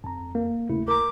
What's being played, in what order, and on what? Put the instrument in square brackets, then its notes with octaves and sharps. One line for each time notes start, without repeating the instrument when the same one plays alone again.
[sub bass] F2 [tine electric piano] A5 A#5
[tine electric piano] A#3
[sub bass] D#2 [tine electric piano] C#3 A3 E4
[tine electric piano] A#4 A#5 [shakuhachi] D6